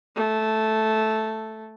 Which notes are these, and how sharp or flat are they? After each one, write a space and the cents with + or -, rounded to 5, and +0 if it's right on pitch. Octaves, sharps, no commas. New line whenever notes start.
A3 -5